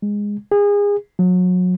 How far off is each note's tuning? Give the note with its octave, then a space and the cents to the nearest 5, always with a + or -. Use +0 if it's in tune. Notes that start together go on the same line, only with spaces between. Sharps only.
G#3 -10
G#4 -30
F#3 -30